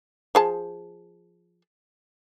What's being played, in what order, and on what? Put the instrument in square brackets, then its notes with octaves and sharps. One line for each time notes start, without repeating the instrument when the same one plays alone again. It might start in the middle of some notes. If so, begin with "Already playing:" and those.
[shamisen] F3 G#4 A5